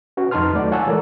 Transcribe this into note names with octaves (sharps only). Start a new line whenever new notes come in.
C#4 F#4 B4
F2 D#4 B4 A5 C6 F6
D#2 F#3 A3 D5 F#5
F4 C#5 F#5 G#5 A5 E6
E3 G#3 A3 A4 A#4 D5